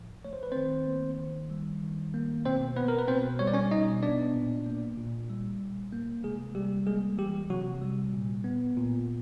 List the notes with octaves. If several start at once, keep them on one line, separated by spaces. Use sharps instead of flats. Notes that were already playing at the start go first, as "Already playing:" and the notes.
Already playing: A2 F3
A3 C#5
C5
B4
D#3 C4 C5
A#3
D#3
G3
D#3
A#3
B2 C4 C5
B3 B4
A#4
B4
B2 C4 C5
G3 C#5
D5
C#4 C#5
B2 D#4 D#5
B3 D4 D5
A#2
A#3
A#2
G3
A#2
A#3
C3 G#3 G#4
G3 G4
G#3 A#3 G#4
E3 G3 G4
C3 F#3 F#4
G3
A#2
B3
A#2